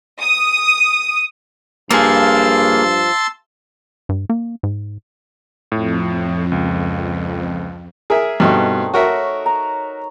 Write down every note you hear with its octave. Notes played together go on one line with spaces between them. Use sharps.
D#6
G2 F3 A#3 G#4 A5 C6 E6
G2
A#3
G#2
F2 A2
C#2
G#4 A#4 E5
G2 B2 A3 C4 D#4
F#4 A#4 C#5 E5
A#5